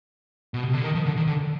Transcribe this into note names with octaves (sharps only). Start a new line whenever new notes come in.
B2
C3
D3
D#3
F3
D3
D#3
D3